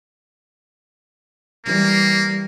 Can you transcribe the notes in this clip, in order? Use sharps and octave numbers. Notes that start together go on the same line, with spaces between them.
E3 G3 A#3